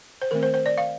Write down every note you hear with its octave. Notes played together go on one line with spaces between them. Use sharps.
C5
D#3 A3 C4 A#4
C5
C5
D5
F5